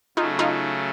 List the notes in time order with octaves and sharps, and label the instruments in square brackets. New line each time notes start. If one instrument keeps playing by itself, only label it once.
[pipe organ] C#3 F#3 A3 [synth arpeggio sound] D#4 F4
[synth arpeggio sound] D#4 F4